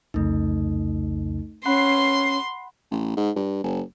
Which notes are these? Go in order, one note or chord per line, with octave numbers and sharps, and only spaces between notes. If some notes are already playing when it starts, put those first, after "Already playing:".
C2 F2 C#3 A3 D#4
C#4 F#5 B5 C6 F#6 C7
A1
G#2
G2
F#1